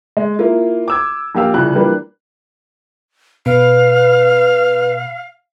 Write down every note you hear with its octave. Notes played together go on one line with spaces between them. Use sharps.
G#3
A#3 E4 F4
D6 E6 G#6
A#1 A#2 G4 F5 E6
C2 C#3 F3 F#6
E3 F3 G3 A#3 D4
B2 B4 F5